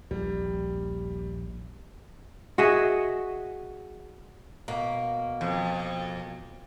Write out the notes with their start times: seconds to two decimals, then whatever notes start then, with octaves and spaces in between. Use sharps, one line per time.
0.11 A#1 D#2 G3
2.58 F#4 G#4 D#5 E5
4.68 B2 A#3
5.41 F2